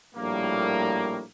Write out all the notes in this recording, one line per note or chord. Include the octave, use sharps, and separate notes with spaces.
A#1 A2 G3 A#3